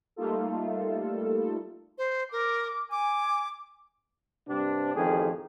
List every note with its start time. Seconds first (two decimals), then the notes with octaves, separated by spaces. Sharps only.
0.16 G3 A3 A#3 D#4 F4 A4
1.98 C5
2.32 A#4 D6
2.91 G#5 D6
4.48 G2 C3 C4 D4
4.95 A1 F2 D#3 G4 G#4